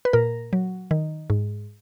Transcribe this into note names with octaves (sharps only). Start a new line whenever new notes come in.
B4
A#2 A#4
F#3
D#3
G#2